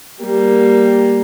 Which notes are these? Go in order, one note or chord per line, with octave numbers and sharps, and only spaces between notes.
G3 A#3